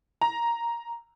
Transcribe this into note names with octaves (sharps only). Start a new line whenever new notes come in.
A#5